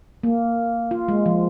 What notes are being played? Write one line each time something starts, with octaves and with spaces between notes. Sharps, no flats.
A#3
F4
G#3
F3